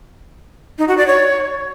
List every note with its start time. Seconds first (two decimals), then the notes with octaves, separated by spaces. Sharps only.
0.78 D#4
0.88 F#4
0.98 D5
1.07 C#5